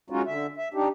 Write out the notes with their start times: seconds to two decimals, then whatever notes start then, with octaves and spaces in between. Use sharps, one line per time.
0.10 F#3 G#3 C#4 D#4 F4 F#4
0.26 D3 E5
0.57 E5
0.74 D4 D#4 G4